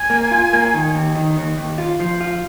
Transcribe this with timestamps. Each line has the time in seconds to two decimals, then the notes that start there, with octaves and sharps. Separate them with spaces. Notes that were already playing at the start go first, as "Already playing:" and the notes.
Already playing: G#5
0.10 A#3
0.31 F4
0.53 A#3
0.74 D#3
0.95 D#2
1.15 D#3
1.37 D#2
1.57 D#2
1.78 F4
2.00 F3
2.21 F4